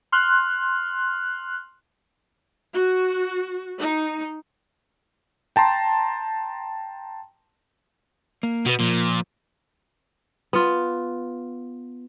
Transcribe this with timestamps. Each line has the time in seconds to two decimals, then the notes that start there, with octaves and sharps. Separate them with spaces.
0.12 C6 F6 F#6
2.75 F#4
3.79 D#4
5.56 G5 A5 A#5 C6
8.43 A#3
8.66 B2 F#4 B4
8.80 A#2 F3
10.53 B3 F4